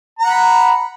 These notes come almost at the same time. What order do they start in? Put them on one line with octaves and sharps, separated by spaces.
A#5 F#5 B5